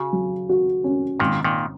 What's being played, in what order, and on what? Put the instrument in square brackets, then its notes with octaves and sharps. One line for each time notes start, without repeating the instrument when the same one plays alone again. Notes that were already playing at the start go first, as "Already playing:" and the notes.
Already playing: [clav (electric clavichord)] C#3 [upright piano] F#4
[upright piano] F#3
F#4
C#4
[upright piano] G#1 [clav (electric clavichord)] A#2 D#3
[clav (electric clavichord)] A#2 D#3